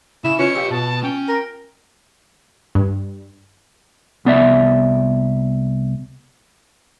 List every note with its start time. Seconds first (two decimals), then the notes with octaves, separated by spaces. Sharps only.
0.24 C#3 E4 E7
0.39 C#4 F4 B4 C#5 C#7
0.55 G4 F5 E6
0.71 B2 B3 A5
1.03 C#4 G5
1.28 A#4
2.75 G2
4.25 C2 B3 D5 E5